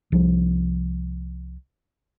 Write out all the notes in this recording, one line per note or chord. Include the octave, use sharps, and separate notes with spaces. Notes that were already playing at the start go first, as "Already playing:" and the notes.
C2 F3